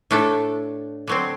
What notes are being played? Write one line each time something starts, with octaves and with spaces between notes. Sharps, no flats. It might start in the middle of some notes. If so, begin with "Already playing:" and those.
A2 A3 D4 A4
D3 F#3 C4